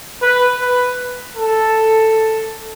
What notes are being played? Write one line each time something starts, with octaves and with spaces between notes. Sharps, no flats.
B4
B4
A4